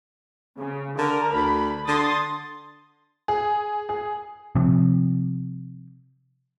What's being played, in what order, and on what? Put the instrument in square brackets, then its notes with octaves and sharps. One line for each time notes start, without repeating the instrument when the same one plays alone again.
[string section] C#3
[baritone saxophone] D3 [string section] A#4
[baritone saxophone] D2 [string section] B5
[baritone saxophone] D3 [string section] C6 D#6 A6
[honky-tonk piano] G#4
G#4
[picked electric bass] C3 F3